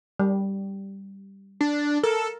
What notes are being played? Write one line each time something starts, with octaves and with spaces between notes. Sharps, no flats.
G3
D4
A4 A#4